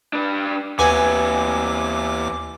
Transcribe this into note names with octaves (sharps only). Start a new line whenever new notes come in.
D4 B4
D#2 E3 B3 C4 G#5 D6